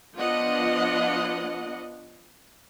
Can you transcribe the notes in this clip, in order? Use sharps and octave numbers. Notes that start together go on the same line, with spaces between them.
F3 B3 D4 F4 D#5 F#5